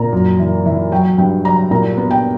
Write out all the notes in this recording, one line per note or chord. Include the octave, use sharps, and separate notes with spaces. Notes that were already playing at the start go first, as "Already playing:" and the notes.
Already playing: A#2 A#5
F#2
E3
E3
F#3 G5
G2 G5
F#3 A#5
A#2 A#5
B3
G5